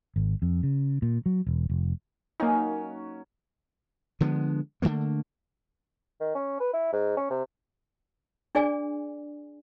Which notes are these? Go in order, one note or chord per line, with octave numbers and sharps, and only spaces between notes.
G#1
F2
C#3
A#2
F#3
E1
F1
F#3 A#3 C#4 D#4
D3 F3 G#3 B3
D3 F3 A3 A#3
D#3
C#4
B4
E4
G#2
C#4
C3
D4 G#4 D5 G#5